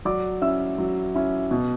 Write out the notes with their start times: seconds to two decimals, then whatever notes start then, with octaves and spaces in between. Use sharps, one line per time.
0.05 F#3 D5 D6
0.42 C#4 E4 E5 E6
0.78 F#3
1.15 C#4 E4
1.51 B2